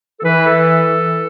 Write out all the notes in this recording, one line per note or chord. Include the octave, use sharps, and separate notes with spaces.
A4
E3 B4
A4